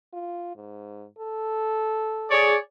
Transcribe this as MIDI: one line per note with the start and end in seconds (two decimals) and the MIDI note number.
0.13 0.52 65
0.55 1.06 44
1.19 2.56 69
2.30 2.56 68
2.30 2.56 73
2.30 2.56 74